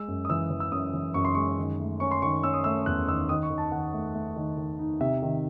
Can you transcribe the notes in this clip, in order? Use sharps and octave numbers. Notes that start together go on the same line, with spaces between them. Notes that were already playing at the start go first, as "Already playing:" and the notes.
Already playing: G#3 E6
F#2
D#6
E3 E6
E3
E6
F#2 D#6
E3
F#2 C#6
C6
G#3 C#6
D#3
A3
C#4 C#6
C6
D#3 C#6
C#4 E6
D#6
A3 E6
E2 F#6
D#3 E6
D#3 D#6
C#6
D#3
A5
D#3 F#5
A3
A3
D#3
D#3
D#4
C3 E5
D#3